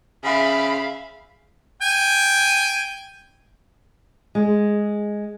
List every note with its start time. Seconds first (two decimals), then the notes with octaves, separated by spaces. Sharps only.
0.24 C#3 E5 F5 B5
1.82 G5 G#5
4.35 G#3